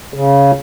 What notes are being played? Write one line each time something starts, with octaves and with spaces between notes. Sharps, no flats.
C#3